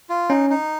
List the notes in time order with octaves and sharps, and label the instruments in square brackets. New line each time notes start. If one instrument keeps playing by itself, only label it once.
[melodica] F4
[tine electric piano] C#4 [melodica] D#4
[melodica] D#4